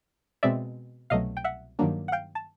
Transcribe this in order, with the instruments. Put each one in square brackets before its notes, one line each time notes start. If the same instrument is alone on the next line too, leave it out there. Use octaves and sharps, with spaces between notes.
[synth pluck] B2 G#3 C4 D5 E5
C2 B2 F#3 A3 D#5 F5
G5
E5 F#5
G2 D#3 F#3 A#3 D4
F#5
F5 G5
A5